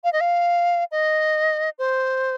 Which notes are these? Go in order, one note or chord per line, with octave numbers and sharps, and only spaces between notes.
F5
D#5
F5
D#5
C5